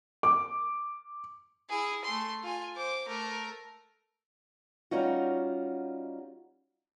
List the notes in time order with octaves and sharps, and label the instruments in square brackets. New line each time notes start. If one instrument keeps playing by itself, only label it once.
[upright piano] D6
[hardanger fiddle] E4 G#4
A3 C6
F4 G#5
C5 D6
A3 A#4
[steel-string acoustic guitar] G3 C#4 D#4 F4 F#4